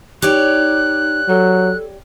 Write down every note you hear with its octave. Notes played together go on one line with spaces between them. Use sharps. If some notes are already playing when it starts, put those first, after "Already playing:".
D#4 G4 C#5 D5 F#6
F#3 A4